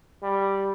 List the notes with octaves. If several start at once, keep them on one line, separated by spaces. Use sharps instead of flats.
G3